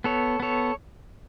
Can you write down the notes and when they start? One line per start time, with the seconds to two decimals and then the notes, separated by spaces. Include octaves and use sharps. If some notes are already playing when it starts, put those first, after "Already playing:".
0.04 B3 A4 C#5
0.40 B3 A4 C#5